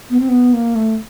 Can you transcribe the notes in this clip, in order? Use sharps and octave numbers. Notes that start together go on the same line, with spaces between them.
B3
C4
B3
A#3
A3